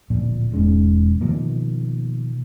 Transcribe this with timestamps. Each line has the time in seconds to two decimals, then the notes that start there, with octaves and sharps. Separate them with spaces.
0.10 D1 A#2 F3
0.52 E1 G#2 G#3 C#4
1.21 B2 D#3 F3 A#3